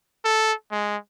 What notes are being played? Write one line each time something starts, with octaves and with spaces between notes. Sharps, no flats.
A4
G#3